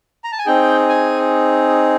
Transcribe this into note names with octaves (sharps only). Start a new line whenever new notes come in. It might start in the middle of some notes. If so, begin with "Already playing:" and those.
A#5
A5
G#5
C4 D#4 G#4 G5
G#5